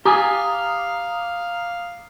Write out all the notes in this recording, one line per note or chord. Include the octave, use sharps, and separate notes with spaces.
G4 F5 G#5 A#5 D6 D#6